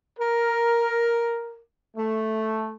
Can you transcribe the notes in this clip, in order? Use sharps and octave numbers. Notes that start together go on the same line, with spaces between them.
A#4
A3